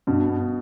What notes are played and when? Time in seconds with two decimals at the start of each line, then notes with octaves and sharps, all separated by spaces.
0.07 G2 B2
0.30 B3